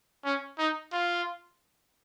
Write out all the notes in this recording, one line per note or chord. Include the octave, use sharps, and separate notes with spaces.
C#4
D#4
F4